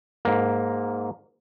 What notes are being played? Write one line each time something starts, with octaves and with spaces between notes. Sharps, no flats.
G#2 A#3